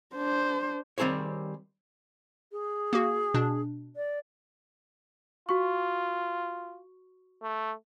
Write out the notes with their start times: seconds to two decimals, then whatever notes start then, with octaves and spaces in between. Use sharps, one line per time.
0.15 D4 C5
0.98 D#3 G3 C4 G#4 C5 C#5
2.51 G#4
2.93 A#3 F#4
3.34 B2 D4
3.96 D5
5.49 F4 F#4 C#6
7.43 A3